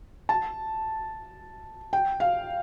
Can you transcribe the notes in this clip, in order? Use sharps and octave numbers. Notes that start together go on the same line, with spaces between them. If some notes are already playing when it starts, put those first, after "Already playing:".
A5
G5
F5